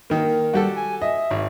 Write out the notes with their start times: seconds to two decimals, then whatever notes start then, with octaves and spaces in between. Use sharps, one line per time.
0.10 D#3 A#3
0.54 G3 F#4 G4 A4
0.76 G#5
1.02 D#5 E5
1.31 G#1